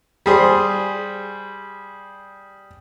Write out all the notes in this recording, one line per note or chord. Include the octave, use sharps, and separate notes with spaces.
G3 G#4 C5